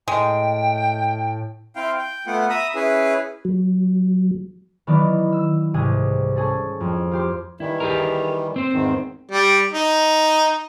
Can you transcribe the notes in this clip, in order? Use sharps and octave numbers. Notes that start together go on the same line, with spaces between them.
A2 G#3 G5
C4 E4 F5 G5
G5
A3 B3 F4 F#5
E5 A#5 B5 D#6
C#4 E4 G#4 B4
F#3
D#3 E3 F#3 B3 D#4 D5
E6
C2 G#2 C3 G#4 C5 D#7
C#4 G#4 A4
F2
F4 G4 C6
D#3 E3 G3 E4
G4 G#4 A#4
C4 C5
E2 G#2 D#3
G3
D#4